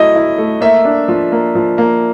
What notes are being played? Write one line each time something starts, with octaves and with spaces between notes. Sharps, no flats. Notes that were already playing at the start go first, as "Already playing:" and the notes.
Already playing: F#3 A3 E4 D#5
E4
A3
A#3 E5
D4
F3
A#3
F3
A#3